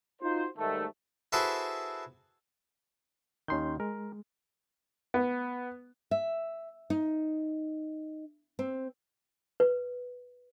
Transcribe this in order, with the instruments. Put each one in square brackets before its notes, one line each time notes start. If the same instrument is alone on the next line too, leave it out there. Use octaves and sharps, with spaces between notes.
[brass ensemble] D#4 F4 F#4 C5
G#2 D#3 G3 A3
[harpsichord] E4 F#4 G#4 A4 B4 C5
[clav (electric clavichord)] D#2 D#3 [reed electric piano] C#4 C6 G6
[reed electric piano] G#3 [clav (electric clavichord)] A#4
[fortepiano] B3
[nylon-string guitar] E5
D#4
C4
[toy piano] B4